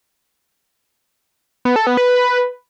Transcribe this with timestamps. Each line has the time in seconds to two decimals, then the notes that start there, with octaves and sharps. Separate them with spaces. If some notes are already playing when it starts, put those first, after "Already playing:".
1.65 B3
1.76 A4
1.87 B3
1.97 B4